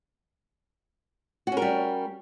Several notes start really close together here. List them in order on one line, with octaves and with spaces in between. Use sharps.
F#4 C#4 A#4 G3